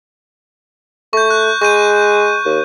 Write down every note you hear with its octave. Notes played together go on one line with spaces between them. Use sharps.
A3 C#6 G6
F#6
G#3 C#6 G6 D#7
D#2